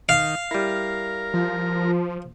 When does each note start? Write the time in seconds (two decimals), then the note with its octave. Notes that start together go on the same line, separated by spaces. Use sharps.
0.09 D#3 F5
0.51 G3 E4 A#4
1.34 F3